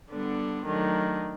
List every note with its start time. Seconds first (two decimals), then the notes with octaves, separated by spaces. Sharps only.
0.11 D3 G3 B3 D4
0.65 D#3 F#3 A3 D4